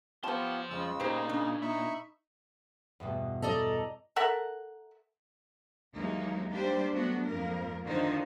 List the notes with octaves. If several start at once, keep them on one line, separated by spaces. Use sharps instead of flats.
F3 B3 F4 G4 C5 C#5 A5 C6
F2 C#3 G#3 E6
A#2 D#4 G4 C5
C#3 D4
D#4 E5 B5 C#6
E2 G2 B2
A4 D5 D#5 A#5
A4 A#4 E5 F#5
D#2 E3 F#3 G#3 A#3 D#4
G3 A#3 D4 G4 C5 D5
F#3 A3 B3 D4 F#4
F2 G#2 A#3 A#4
D3 D#3 D4 D#4 F4 C5